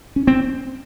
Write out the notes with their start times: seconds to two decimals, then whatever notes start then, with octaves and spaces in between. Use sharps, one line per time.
0.16 C#4
0.27 C4